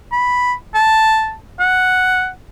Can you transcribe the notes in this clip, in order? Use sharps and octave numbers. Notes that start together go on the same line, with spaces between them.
B5
A5
F#5